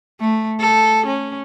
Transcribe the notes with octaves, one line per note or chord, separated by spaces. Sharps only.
A3
A4
C#4